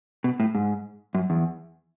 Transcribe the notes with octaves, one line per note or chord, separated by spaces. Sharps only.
B2
A2
G#2
F#2
E2